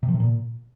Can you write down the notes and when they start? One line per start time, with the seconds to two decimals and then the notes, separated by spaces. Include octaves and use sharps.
0.03 C3
0.08 F3
0.14 C3
0.20 A#2